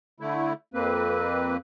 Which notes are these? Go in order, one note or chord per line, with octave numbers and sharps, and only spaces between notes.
D3 A3 E4
F2 A#3 C4 B4